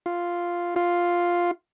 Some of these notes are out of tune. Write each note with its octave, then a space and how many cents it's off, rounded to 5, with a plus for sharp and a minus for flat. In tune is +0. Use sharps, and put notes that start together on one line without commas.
F4 +0
F4 +5